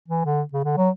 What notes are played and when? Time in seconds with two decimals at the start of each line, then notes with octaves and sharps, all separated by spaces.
0.08 E3
0.25 D3
0.53 C#3
0.65 D3
0.77 F#3